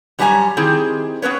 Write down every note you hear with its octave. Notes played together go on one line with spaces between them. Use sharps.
F#2 G3 C#4 F#4 G#5 A#5
D#3 C4 E4 G4 G#4
B3 C#4 B4 C#5